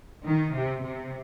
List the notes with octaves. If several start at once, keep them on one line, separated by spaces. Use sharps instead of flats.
D#3
C3
C3